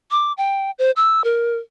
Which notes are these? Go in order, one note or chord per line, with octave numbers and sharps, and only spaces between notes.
D6
G5
C5
E6
A#4